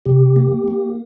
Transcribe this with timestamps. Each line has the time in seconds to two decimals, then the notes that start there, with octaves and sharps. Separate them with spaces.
0.05 C3 G4
0.36 A#3
0.68 A#3